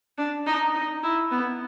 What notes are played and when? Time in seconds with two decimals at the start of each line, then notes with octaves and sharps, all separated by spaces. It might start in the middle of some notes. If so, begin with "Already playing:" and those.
0.18 D4
0.47 D#4
0.74 D#4
1.03 E4
1.31 B3